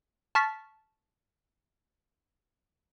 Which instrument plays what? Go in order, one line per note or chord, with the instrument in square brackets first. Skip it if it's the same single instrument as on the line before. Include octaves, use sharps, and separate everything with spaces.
[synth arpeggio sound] A5 C#6 F6 A6 B6